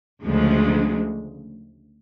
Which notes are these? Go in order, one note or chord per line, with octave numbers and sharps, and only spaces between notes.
D2 C#3 F3 G#3